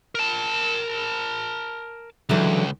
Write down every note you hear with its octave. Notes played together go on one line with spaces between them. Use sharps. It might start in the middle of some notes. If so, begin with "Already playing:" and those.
A#4 A5
C#2 D3 E3 F#3